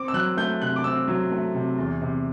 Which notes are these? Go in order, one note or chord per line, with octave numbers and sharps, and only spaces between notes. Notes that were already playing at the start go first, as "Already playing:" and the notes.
Already playing: C4 D6
E6
F#3 F#6
A3 G6
C3 F#6
D6
C4 E6
F#3
A3
C3
E2
C3